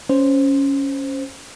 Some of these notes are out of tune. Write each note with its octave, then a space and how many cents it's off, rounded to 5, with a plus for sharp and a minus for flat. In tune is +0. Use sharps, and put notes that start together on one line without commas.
C#4 +0 C5 +0